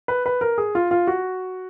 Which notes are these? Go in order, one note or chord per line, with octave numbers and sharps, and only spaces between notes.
B4
B4
A#4
G#4
F4
F4
F#4